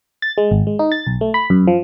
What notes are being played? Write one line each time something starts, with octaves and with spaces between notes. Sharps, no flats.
A6
G#3
G#1
G#3
D#4
A6
B1
A3
B5
F#2
F3